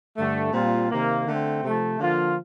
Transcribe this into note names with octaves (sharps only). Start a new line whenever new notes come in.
G2 D3 A3
A#2 G3 C4 F4
C3 D#3 A#3
D3 A3 C4
C3 F3 A3
D3 F3 A#3 F4